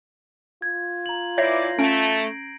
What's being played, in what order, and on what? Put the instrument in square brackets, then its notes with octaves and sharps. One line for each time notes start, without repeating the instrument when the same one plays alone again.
[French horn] F4 [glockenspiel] G#6
[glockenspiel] A#5 F#7
[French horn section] E3 E4 D5 [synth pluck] C#5 E5 [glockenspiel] G6 A#6 C7
[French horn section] A3 [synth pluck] C#4 [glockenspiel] D7